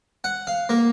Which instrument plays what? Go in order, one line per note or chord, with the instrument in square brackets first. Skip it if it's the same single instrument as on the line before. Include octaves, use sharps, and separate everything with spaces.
[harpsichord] F#5
F5
A#3